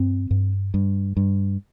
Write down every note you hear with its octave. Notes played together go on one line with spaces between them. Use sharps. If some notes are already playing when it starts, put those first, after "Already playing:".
Already playing: G2 C4
G2
G2
G2